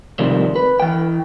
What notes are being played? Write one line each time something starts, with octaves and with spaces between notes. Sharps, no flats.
G#2 C3 D#3 F3 G3
B4
E3 G5